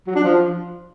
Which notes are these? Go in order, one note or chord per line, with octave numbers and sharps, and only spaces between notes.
F#3
D4
F3